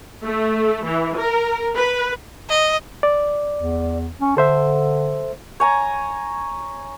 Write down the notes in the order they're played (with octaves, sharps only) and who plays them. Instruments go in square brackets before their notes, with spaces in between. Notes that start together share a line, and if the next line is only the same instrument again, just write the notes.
[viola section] A3
E3
A#4
B4
[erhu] D#5
[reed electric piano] D5
[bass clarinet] E2
C#4
[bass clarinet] D3 [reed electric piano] A4 C5 E5
[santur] C#5 G#5 A#5